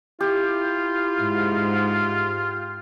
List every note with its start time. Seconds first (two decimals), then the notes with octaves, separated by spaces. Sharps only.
0.21 E4 F4 G4
1.17 G#2